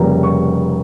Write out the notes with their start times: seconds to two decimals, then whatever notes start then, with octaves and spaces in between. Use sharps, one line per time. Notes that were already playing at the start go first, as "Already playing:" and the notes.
Already playing: F1 F2 C#3 G3 A#3 A#5
0.23 C#6